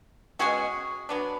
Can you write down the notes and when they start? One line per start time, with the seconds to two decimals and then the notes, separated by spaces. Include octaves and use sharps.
0.39 B2 G#3 C#4 F#4 G#4
1.09 F#3 B3 D4